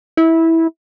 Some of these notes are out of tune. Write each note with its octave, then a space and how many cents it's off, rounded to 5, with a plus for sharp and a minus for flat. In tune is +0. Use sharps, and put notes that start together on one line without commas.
E4 -15